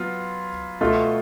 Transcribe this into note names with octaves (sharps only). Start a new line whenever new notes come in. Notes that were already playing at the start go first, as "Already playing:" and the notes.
Already playing: F#3 B3 F4
B2 A3 F4